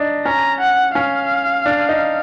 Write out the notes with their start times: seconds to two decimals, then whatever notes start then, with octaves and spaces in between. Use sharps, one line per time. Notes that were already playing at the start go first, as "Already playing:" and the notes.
Already playing: D4 D#4
0.25 C#4 A#5
0.61 F#5
0.95 C#4 F5
1.66 D4
1.89 D#4